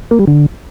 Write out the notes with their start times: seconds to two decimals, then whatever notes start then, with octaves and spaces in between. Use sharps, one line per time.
0.11 A#3
0.19 G3
0.28 D3